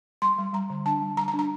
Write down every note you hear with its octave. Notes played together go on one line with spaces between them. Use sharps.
G3 C6
G3
G3 A#5
D3
D4 A5
G3
G3 A#5
A#5
D4
A#5